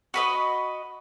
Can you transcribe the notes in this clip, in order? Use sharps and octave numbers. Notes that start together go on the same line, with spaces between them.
F#4 B4 D#5